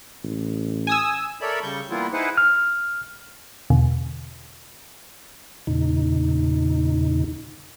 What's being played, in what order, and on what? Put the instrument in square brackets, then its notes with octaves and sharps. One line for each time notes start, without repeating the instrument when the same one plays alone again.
[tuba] A1
[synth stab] G#5 D#6 E6
[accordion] A4 A#4 C#5 D5 E5 B5
C#3 G3 C#6 G6
E3 G3 A#3 B3 E4 F4
D#4 E4 G#4 B4 C5 F#5
[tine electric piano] F6
[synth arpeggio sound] E2 B2 D3
[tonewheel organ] E2 A#2 C#3 D#4